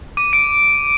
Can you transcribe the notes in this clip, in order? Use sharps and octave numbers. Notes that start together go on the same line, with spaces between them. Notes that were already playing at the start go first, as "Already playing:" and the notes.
D6 D#7
D7